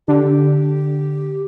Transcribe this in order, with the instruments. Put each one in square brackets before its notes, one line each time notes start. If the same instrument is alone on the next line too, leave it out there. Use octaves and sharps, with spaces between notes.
[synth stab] D3 [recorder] G4